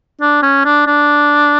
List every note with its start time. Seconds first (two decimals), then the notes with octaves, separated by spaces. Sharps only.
0.21 D4
0.42 C#4
0.65 D4
0.86 D4